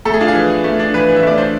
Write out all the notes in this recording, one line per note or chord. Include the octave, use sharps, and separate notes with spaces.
A3 A4
G#4
D4 F4
G#4
E3
E3
A3
D4
E3 B4
E3
E5
A3 D5
D4 C5